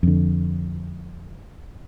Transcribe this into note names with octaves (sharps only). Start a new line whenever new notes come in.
F2 D3